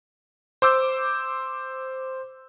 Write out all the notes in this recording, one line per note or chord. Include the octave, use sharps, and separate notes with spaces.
C5 D6 E6 G6